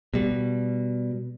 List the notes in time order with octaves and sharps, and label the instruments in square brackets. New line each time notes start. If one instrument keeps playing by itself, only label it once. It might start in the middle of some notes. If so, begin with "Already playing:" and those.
[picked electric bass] B2 G3